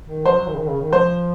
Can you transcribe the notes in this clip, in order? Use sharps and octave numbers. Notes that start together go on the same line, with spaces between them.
D#3
F3 C5
F#3
D#3
C#3
D#3
C#3
D#3
F3 C5